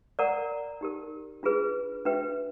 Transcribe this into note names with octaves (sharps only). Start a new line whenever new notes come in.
A#4 D5 F#5 A#5
D#4 G4 A#4
D4 F4 G#4 B4
D4 F#4 B4 E5 G5